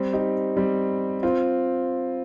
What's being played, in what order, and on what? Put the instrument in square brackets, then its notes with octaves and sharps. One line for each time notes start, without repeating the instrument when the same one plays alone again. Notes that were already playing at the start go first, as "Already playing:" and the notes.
Already playing: [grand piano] G3 C4
D#4 G4
G3 C4
C4 F4